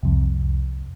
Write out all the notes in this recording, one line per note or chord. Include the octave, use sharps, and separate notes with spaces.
C2 F2